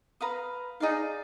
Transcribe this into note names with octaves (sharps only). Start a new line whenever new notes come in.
B4 F5 A#5 D#6
D#4 G#4 D5 F5